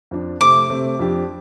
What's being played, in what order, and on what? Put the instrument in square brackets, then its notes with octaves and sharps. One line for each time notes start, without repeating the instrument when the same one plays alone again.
[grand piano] F2 F3 D4
[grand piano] C3 A3 C4 [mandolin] D6
[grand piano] C3 A3 C4
F2 F3 D4 G4